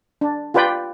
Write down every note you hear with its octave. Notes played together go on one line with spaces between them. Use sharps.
D4
F4 G4 B4 D5 G5